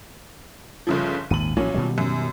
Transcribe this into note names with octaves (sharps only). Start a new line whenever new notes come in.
G1 C#3 F3
G#1 D#2 A#2 D#7 F#7
A1 A#2 F#3 C#4
B2 D#3 G3
F#2